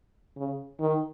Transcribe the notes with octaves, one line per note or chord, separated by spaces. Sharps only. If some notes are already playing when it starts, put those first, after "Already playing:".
C#3
D#3